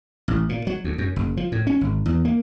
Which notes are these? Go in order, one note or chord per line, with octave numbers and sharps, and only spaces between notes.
A1
A#2
F#3
D2
F#2
F#1
F3
A2
C#4
G#1
E2
A#3